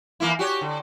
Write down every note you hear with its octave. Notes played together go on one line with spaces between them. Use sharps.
E3 A#3 E4
F#4 G4 C#5
D3